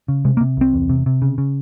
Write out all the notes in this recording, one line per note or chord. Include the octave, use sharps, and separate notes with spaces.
C#3
C3 G#3
A#3
C3
C2 C4
E2
C3
C3
C#3
C#3